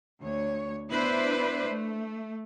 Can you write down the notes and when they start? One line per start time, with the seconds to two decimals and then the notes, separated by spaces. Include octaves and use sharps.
0.21 D2 C#5
0.90 B3 D4 E4 B4 C5 D5
1.67 A3